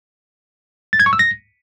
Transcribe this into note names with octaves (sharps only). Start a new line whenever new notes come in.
A6
G#6
C#6
E6
A#6